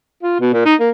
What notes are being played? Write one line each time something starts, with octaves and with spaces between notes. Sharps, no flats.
F4
B2
A#2
D#4
A#3